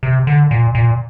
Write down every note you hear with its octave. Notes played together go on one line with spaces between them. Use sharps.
C3
D3
A#2
A#2